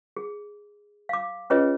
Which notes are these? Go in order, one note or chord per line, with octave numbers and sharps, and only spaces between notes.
G#4
F5 D6
C#4 F4 G#4 B4 C#5 D#5